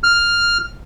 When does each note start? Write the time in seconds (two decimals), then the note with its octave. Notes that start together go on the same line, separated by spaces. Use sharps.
0.04 F6